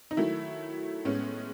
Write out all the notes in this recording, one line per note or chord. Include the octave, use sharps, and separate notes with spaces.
D#4
D#3 F#3 A3 E4
A2 G#3 B3 C#4